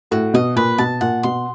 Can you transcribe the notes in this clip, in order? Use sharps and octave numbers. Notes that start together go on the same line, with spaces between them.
A2 F#4
B2 D#5
A#2 B4
B2 A5
A#2 F#5
B2 C6